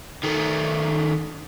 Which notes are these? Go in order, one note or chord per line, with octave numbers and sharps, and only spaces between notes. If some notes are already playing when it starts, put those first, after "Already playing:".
D#3 A3